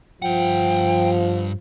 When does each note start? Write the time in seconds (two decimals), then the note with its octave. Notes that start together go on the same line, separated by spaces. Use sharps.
0.22 G2 F3 F#5 G5